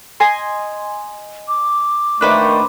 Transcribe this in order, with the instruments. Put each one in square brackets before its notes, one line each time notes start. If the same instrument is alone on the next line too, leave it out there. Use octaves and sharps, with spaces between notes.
[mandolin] D#5 G#5 C6
[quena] D6
[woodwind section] A#2 D#3 A3 [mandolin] D4 B4 C5